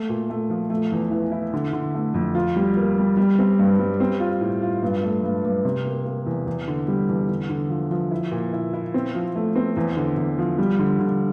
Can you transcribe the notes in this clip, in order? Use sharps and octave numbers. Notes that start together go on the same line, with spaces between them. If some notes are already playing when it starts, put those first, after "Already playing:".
Already playing: A3
A#2
A3
F3
A3
E2
E3
E4
D3
D3
A3
F2
F4
G3
A#3
G3
G3
C4
G2
G3
C4
F4
A2
F4
G2
A3
G2
G2
C3
A#3
A#3
E2
E2
D3
G3
E2
D3
D3
F3
F3
E4
A#2
E4
E4
C4
F3
A3
C4
E2
D3
E2
F3
G3
D3
D3